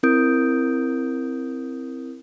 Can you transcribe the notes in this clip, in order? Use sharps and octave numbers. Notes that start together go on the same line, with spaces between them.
C4 E4 A#4 D#6 G6 D7